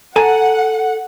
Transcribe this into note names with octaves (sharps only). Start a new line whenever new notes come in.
A4 F#5 G#5 A#5